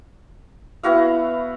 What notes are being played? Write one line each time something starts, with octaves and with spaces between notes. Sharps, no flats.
B3 E4 F#4 F5